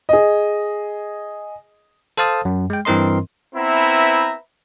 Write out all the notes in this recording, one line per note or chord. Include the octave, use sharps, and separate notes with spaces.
G#4 D#5
A4 C5 F5 A5 D#6
F#2
G#3 G5
G2 E3 C4 A#4 D#5 C6
B3 C4 E4 B4 E5 A#5